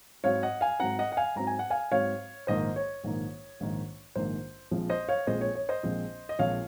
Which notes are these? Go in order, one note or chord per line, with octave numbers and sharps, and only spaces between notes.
G#2 F#3 C4 C#5 F5
D#5 F#5
F5 G#5
G#2 F#3 C4 F#5 A#5
D#5 F#5
F#5
F5 G#5
G#2 F#3 C4 A#5
G#5
F#5
F5 G#5
G#2 F#3 C4 C#5 F5
A#1 G#2 D#3 A#3 C5 D#5
C#5
A#1 G#2 D#3 A#3
A#1 G#2 D#3 A#3
A#1 G#2 D#3 A#3 C5
A#1 A#2 F3 G#3 C4
C5 D#5
C#5 F5
A#1 A#2 F3 G#3 C4 C5 D#5
C#5
C#5
C5 D#5
A#1 A#2 F3 G#3 C4
D#5
A#1 A#2 F3 G#3 C4 C#5 F5